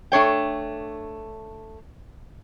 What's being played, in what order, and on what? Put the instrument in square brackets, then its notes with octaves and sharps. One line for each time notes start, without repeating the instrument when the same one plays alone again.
[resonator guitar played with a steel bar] A3 D4 C#5 G5